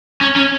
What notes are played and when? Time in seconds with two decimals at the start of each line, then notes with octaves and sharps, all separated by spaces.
0.21 C#4
0.36 C#4